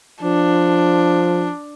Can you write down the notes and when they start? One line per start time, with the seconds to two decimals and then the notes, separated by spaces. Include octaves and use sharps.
0.23 F3 D4